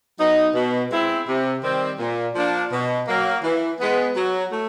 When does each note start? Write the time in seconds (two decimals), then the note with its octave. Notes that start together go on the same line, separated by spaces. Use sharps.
0.19 F#3 B3 D#4
0.54 B2
0.91 G#3 C4 E4
1.28 C3
1.63 D#3 G3 C4
1.99 A#2
2.35 F3 A#3 D4
2.71 B2
3.07 F#3 A#3
3.43 E3
3.79 G#3 B3
4.16 F#3
4.51 A3